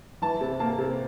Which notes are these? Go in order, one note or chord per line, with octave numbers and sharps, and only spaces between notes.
E3 A5
C3
A#3 A5
C3